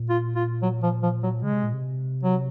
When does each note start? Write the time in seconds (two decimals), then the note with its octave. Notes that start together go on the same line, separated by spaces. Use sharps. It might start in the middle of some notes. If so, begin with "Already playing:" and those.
Already playing: A#2
0.09 F4
0.36 F4
0.62 F#3
0.83 F3
1.03 F3
1.23 F#3
1.42 C#3 G#3
1.53 C3
1.63 A#2
1.73 C3
2.23 F#3